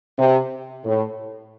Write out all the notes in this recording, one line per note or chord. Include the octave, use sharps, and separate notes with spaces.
C3
A2